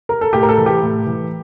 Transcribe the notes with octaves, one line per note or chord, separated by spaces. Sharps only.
A#4
A4
A2 G4
A#4
A4
E3
G4
A2
E3